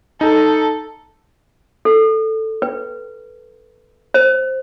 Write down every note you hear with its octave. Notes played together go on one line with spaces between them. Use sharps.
D#4 A4
A4
B4
C5